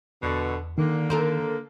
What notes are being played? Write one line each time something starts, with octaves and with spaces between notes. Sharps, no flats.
E2 B2 D3
D3 D#3 A#3
A4 A#4 C5